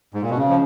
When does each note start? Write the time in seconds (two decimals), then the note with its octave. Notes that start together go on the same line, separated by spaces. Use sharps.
0.14 G#2
0.22 A#2
0.30 B2
0.37 C#3 C#4
0.49 F3